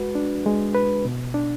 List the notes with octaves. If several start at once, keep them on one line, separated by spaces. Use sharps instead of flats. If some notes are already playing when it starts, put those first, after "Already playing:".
Already playing: G#3 F#4 B4
D4
G#3
B4
B2
D4